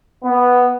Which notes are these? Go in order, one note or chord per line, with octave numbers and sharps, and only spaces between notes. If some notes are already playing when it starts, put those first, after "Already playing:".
B3